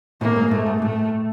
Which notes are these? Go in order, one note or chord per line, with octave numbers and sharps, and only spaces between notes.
A2 A#3
G#2
G#2 A3
G#2
A2 A3